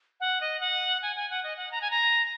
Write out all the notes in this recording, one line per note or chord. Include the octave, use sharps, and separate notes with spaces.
F#5
D#5
F#5
G#5
G#5
F#5
D#5
F#5
A#5
G#5
A#5